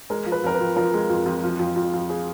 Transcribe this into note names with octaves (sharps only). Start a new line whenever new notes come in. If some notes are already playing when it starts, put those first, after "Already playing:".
G#3 A#4
F3
B4
F2 A#4
B4
F2
F3 A#4
G#3
F2
F2
F3
F2
F2
F2
G#4